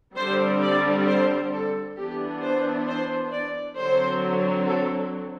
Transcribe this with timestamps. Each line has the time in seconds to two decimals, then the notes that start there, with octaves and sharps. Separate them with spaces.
0.16 D3 G3 C4 C5
0.61 D5
1.07 C5
1.52 A4
1.96 E3 B3 D4 G4
2.42 C5
2.87 C5
3.32 D5
3.77 D3 F#3 C4 C5
4.67 A4